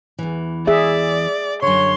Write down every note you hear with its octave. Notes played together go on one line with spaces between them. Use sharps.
E2 E3
G#4 D5 E5
F#2 D3 C#5 C6